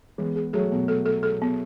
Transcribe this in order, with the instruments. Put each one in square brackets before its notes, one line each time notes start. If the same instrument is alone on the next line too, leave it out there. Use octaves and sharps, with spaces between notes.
[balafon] E3 [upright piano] G#3 B3
[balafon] G#4
[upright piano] F#3 A3 [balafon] G#4
[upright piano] B2 [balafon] B3
[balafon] A4
A4
A4
B3